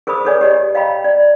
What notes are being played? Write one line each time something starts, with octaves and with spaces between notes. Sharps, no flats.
G#4 A#4 C5 B5 D#6
G#4 A4 B4 C#5 D5 G#5
G4 C#5 D#5
D#5 F5 G5 A#5 B5
D5